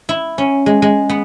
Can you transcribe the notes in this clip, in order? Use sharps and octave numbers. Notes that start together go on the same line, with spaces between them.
E4
C#4
G#3
G#3
B3